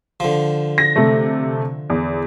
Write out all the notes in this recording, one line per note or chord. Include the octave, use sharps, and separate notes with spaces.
D3 F3
A#6
C3 A3
E2